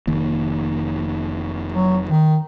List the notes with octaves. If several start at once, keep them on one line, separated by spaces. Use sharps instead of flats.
F1 D#3 A#3
F#3
D#3